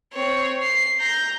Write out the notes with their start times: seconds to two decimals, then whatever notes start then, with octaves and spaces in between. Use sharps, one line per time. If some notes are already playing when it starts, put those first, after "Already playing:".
0.14 C4 C#5
0.62 C7
0.99 A#5 G6